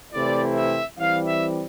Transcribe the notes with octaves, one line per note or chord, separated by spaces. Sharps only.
C3 E3 A3 C4 E4 D5
E5
E3 G3 C4 F5
E5